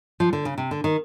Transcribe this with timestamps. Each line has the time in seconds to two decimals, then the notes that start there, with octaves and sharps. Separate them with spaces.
0.20 F3
0.33 D3
0.45 C#3
0.58 C3
0.71 D3
0.84 D#3